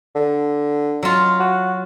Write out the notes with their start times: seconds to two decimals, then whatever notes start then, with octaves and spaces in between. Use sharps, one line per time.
0.15 D3
1.03 F#3 F4
1.40 F#4